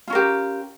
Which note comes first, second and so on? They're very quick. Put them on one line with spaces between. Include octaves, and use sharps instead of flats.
F4 C#4 A#4 G4